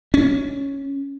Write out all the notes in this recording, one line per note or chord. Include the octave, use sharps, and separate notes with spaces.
C#4